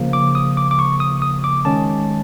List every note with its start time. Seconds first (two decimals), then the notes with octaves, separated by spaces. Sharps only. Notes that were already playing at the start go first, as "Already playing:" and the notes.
Already playing: C#3 F3 A#3
0.13 D6
0.35 D#6
0.57 D6
0.71 D6
0.79 C#6
1.00 D#6
1.22 D#6
1.44 D6
1.65 D#3 G#3 C#4 A5